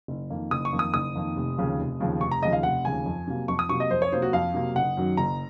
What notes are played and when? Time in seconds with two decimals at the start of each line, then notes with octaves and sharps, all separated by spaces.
0.08 F#1
0.30 F2 D#3 A#3
0.51 F#1 D#6
0.65 C#6
0.73 F2 D#3 A#3
0.79 D#6
0.94 F#1 D#6
1.15 F2 D#3 A#3
1.36 F1
1.58 D#2 C#3 F3
1.79 F1
2.00 D#2 C#3 F3
2.21 F1 C#6
2.31 A#5
2.42 D#2 C#3 F3 D#5
2.53 F5
2.63 F1 F#5
2.85 D#2 C#3 F3 G#5
3.06 F2
3.27 C3 F#3 A#3
3.48 F2 C#6
3.59 D#6
3.69 C3 F#3 A#3 C#6
3.80 D#5
3.90 F2 C5
4.02 C#5
4.12 C3 F#3 A#3 C5
4.22 F#4
4.33 F2 F5
4.54 C3 F#3 A#3
4.75 F#1 F#5
4.97 F#2 D#3 F#3
5.17 F#1 A#5